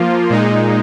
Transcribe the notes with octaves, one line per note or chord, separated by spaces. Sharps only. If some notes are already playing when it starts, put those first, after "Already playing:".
Already playing: F3 A#3 F4
A#2 G#3 D#4